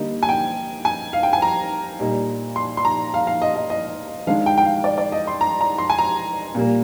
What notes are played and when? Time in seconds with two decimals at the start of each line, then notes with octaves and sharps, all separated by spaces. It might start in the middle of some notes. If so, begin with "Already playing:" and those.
Already playing: D3 G3 A#3 D#4
0.23 G#5
0.29 G5
0.85 G#5
1.13 F5
1.23 G5
1.33 G#5
1.42 A#5
1.99 A#2 G3 A#3 D#4
2.56 C6
2.77 C6
2.85 A#5
3.14 F5
3.27 F5
3.42 D#5
3.56 D#5
3.70 D#5
4.27 D#3 G#3 D4 F5
4.46 G5
4.58 G5
4.65 F5
4.84 D5
4.98 D5
5.12 D#5
5.27 C6
5.41 A#5
5.61 A#5
5.78 C6
5.90 G#5
5.98 A#5
6.55 A#2 G3 A#3